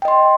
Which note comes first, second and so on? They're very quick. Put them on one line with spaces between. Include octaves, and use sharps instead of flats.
G5 D#5 C6